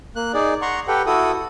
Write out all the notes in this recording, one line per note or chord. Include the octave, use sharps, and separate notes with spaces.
A#3 F#6
D#4 G#4 D5
F#5 A#5 C6 C#6
G4 A4 B4 F#5 G5
E4 F#4 A4 D#6